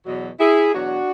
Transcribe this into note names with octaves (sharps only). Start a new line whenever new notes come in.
E2 B2 F#3
E4 G#4
E2 B2 F#3 D4 F#4